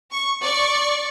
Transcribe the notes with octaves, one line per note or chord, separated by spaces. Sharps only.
C#6
D5 C#6